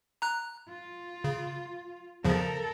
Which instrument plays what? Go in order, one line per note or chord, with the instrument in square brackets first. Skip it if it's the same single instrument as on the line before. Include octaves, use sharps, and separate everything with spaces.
[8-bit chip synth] A#5 F#6
[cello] F4
[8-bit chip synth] C#3
[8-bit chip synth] E2 C#3 F3 [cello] A4 A#4